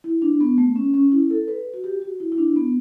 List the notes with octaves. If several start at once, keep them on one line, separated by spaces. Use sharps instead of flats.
E4
D4
B3
A3
C#4
C#4
E4
A4
B4
F#4
G4
F#4
E4
E4
D4
B3